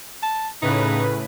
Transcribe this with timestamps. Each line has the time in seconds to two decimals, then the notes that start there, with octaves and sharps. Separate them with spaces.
0.22 A5
0.62 A2 C#3 D#4 B4